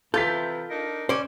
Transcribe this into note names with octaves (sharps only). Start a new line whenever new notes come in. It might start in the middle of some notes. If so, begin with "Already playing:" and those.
C3 E3 F4 A4 G6 A6 B6
D4 D#4 A#4
C#4 C5 D5